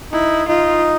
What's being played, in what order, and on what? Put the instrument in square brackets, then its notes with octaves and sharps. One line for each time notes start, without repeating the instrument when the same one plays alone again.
[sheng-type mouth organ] D#4 [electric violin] E4
[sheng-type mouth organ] D#4 [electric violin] F4